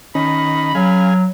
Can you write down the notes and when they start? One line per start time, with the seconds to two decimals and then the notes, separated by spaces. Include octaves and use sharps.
0.15 D#3 C#4 B5
0.75 F#3 G#4 F5